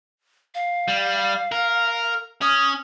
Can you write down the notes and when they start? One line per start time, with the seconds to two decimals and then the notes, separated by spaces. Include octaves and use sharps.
0.54 F5
0.88 G3
1.52 A#4
2.41 C#4 D#6